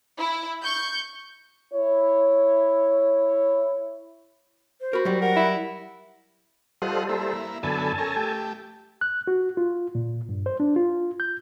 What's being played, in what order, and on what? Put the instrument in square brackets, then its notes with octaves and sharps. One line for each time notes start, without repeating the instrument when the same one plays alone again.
[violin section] E4
C#6 G6
[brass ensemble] E4 C#5
[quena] C5
[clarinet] F#4 [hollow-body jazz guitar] A#4 B5
[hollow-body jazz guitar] F#3 G3
[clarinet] A#4 [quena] F#5
[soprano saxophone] E4
[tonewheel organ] G3 A4 C5 [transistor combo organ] F4 D#5 F#5
[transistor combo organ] A#3 E4
[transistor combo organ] F#2 D3 B3 [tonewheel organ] A4 G#5 A5
[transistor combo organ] C#4 A#4
A3 G4
[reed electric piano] F#6
F#4
F4
A#2
G2
C5
D4
F4
G6